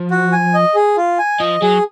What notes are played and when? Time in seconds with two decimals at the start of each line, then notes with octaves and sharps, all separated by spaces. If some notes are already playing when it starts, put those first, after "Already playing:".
Already playing: F3
0.11 F#4
0.32 G#5
0.54 D#5
0.75 G#4
0.97 F4
1.19 G#5
1.40 F3 D#5
1.62 F#3 G#4